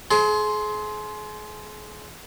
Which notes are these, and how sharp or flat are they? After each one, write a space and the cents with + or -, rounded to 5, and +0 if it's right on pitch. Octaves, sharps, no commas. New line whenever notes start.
G#4 +35 C5 +0